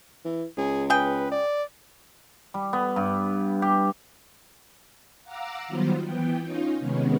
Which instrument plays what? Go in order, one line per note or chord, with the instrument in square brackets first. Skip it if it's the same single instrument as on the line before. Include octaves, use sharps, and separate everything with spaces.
[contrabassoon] E3
[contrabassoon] C#2 [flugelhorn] G#4
[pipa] G#4 G5 [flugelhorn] B4
[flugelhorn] D5
[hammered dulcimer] G3
B3
G2
G4
[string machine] F5 F#5 A#5 D6 E6
D#3 F#3 G3 B3 F4 C5
E3 B3 G5
C#4 D#4 F4
C3 D#3 G#3 B3 C#4